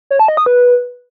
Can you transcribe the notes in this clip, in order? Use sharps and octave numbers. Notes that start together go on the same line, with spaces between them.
C#5
A5
D#5
D#6
B4